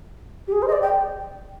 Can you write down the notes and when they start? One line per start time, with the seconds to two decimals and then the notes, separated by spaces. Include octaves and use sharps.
0.48 G4
0.52 G#4
0.62 C5
0.67 D#5
0.72 D5
0.82 G5